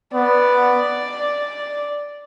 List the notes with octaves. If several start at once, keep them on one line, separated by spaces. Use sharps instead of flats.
B3 D5